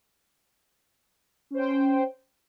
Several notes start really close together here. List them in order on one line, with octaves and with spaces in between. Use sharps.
C#4 C5 G5